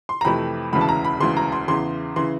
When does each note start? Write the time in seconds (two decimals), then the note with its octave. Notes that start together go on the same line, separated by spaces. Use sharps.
0.09 C6
0.21 A#5
0.25 F2 C3 E3 A3 B5
0.72 E1 D2 C#3 E3 B5
0.81 A5
0.89 A#5
1.05 B5
1.20 E1 D2 C#3 E3 C6
1.37 A#5
1.52 C6
1.68 E2 C#3 E3 C6
2.16 C#3 E3 C6